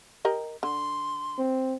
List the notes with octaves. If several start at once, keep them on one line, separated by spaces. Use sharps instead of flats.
G4 A#4 D#5
D3 C6
C4